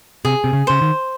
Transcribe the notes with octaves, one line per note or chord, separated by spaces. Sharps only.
C3 G#4
C3
C#3
C#3 C5
D#3